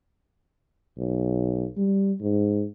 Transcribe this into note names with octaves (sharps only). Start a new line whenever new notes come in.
B1
G3
G#2